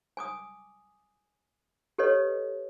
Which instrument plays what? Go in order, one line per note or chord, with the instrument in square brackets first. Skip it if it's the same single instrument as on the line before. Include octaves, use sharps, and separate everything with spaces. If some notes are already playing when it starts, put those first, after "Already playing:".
[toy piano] G#5 D6 D#6
G4 A4 B4 C#5 D#5